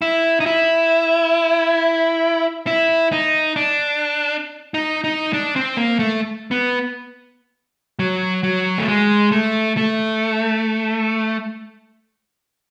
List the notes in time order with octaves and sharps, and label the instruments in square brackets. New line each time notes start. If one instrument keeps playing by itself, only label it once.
[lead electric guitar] E4
D#4
E4
E4
D#4
D4
D#4
D#4
D4
C4
A#3
A3
B3
F#3
F#3
A3
G#3
A3
A3